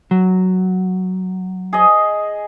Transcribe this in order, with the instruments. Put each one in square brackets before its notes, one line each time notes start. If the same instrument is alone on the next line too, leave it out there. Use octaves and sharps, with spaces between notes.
[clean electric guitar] F#3
[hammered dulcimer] G#4 D#5